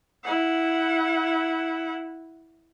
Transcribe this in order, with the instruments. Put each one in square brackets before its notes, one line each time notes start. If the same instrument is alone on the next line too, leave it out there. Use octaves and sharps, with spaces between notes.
[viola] E4 F#5